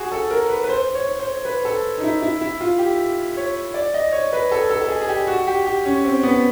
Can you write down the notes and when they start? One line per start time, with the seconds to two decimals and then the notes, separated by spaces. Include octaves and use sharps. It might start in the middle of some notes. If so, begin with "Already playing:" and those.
Already playing: F#4 G#4
0.12 A4
0.31 A#4
0.49 B4
0.63 B4
0.69 C5
0.95 C#5
1.19 C5
1.45 B4
1.65 A4
1.98 D#4
2.03 E4
2.22 E4
2.41 E4
2.61 F4
2.79 G4
3.37 C#5
3.74 D5
3.94 D#5
4.12 C#5
4.33 B4
4.52 A4
4.70 A4
4.81 A4
4.89 G#4
5.01 G#4
5.09 G4
5.27 F#4
5.47 G4
5.66 G4
5.85 C#4
6.04 C4
6.23 B3